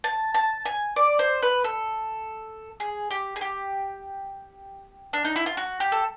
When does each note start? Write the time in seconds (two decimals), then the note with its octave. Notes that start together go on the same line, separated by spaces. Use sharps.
0.04 A5
0.34 A5
0.66 G#5
0.96 D5
1.19 C5
1.42 B4
1.64 A4
2.80 G#4
3.10 G4
3.36 G#4
3.41 G4
5.13 D4
5.25 D#4
5.36 E4
5.46 F4
5.57 F#4
5.80 G4
5.92 A4